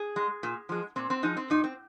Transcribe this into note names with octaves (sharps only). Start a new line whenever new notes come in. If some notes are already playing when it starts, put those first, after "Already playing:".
Already playing: G#4
G#3
A#2
F3 G#3
A#2 C4
C4
F3 G#3 D#4
C4
A#2 D#4
C4